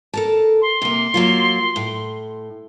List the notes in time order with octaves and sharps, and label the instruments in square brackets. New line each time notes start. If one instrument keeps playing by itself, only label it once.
[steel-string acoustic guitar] A4 A#4 A5
[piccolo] C6
[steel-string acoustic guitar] C3 A#3
F#3 A#3 F4
A2